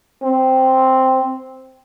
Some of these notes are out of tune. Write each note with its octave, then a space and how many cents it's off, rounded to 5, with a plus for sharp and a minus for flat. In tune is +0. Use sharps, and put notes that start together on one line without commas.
C4 +0